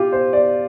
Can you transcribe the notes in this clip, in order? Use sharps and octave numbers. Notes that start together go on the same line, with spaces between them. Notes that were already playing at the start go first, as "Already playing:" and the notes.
Already playing: F4 G4
C5
D5